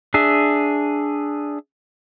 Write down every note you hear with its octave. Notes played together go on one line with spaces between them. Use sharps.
D4 G#4 E5